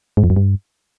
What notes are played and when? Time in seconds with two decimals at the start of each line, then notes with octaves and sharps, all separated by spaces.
0.17 G#2
0.24 F2
0.30 F#2
0.36 G2